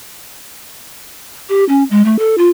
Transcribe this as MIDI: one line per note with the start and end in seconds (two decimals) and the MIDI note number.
1.49 1.64 67
1.69 1.83 61
1.90 2.04 56
2.05 2.19 57
2.19 2.38 69
2.38 2.49 65